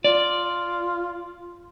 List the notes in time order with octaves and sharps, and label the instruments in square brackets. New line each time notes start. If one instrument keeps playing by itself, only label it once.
[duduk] F4 [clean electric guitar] D5